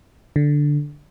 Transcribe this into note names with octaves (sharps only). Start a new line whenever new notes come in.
D3